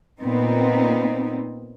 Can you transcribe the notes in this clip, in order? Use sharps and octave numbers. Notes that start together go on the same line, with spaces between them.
A#2 B3 C4 D#4